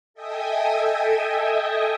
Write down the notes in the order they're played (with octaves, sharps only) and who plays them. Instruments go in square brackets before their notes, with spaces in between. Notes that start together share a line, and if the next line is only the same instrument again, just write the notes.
[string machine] A4 D#5 E5 G5 G#5 D#6